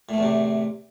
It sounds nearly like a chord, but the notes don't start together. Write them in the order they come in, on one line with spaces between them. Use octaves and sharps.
A2 A3 E2 C3